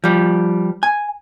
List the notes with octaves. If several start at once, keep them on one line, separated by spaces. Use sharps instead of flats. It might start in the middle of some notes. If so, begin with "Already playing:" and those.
F3 G3
G#5